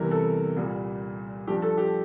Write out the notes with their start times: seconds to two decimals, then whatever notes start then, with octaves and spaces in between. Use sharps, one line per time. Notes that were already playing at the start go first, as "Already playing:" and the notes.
Already playing: E2 C3 E3 G3 A#4
0.11 A4
0.57 C2 A#2 G3
1.47 G2 F3 G4
1.62 A4
1.78 G4